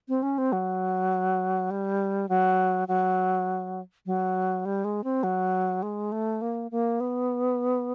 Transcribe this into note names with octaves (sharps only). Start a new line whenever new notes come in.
C4
C#4
C4
F#3
G3
F#3
F#3
F#3
G3
G#3
C4
F#3
G#3
A3
A#3
A#3
B3